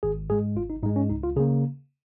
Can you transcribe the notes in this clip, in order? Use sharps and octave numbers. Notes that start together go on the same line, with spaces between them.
G#1 G#4
G#2 G#3 G#4
G#1 F4
D#4
G#2 G#3 D#4
C#4
C#2 D#4
F4
C#3 A#3 G#4